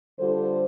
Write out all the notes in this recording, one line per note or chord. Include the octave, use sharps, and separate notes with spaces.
D3 G3 F4 A4 C5